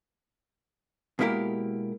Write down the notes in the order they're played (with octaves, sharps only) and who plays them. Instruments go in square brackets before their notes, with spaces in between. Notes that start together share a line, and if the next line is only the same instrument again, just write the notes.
[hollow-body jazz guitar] B2 G#3 A#3 E4 G4 A#4